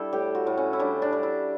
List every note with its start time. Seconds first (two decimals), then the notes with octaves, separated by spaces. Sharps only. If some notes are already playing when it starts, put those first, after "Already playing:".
Already playing: G3 D4 E4 A4
0.13 A2 G4
0.35 F#4
0.47 A2
0.57 C#4
0.73 E4
0.79 G3 D4
1.02 D4
1.12 G3
1.23 E4